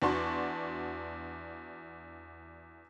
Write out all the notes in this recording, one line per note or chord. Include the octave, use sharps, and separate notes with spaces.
E2 D4 F#4 A5 C6 C#6